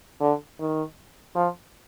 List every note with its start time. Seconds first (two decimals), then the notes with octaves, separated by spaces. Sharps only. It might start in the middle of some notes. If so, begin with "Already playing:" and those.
0.21 D3
0.60 D#3
1.36 F3